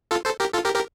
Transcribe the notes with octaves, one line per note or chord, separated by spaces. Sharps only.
F4 A4
A4 C5
G4 A#4
F4 A4
G4 A#4
G4 A#4